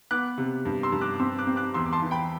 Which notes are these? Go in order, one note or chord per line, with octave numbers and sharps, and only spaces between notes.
B3 D6 F#6
C3
G2
C6 E6
G2
D6 F#6
D6
C4 C6 E6
D6 F#6
C4
D6 F#6
E2 C6 E6
D6
A5 C6
E3
G5 B5